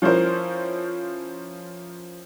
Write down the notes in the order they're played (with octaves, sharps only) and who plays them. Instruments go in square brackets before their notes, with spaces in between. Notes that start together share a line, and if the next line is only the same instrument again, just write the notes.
[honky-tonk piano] F3 C#4 E4 A#4 C5